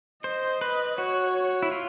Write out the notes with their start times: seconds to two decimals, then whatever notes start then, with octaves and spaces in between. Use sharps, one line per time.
0.24 C5 D#5
0.61 B4
0.98 F#4 C#5
1.63 E4
1.72 F4